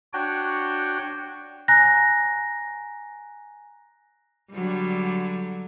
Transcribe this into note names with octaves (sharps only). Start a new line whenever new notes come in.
D4 F#4 C#5 G5
G#5 A#5 F#6 A#6
D3 F#3 G3